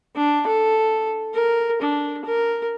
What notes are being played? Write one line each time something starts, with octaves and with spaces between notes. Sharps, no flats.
D4
A4
A#4
D4
A#4